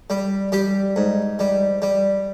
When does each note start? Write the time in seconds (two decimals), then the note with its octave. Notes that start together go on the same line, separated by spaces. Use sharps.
0.10 G3
0.52 G3 G4
0.96 G#2
1.39 G3
1.82 G3